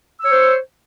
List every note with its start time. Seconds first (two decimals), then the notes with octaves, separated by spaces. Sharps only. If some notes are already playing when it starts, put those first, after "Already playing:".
0.21 E6
0.25 C#5
0.30 C5